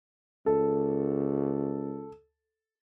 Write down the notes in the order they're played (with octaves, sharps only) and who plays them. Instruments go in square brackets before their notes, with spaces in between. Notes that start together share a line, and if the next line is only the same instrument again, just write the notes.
[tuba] C#2 [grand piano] A4